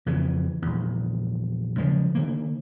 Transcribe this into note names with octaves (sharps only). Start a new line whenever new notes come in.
F2 C#3 E3
A#1 E2
C#3 F3 F#3 G#3
D3 D#3 A#3